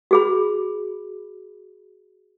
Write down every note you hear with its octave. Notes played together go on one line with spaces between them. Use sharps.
F#4 G#4 B5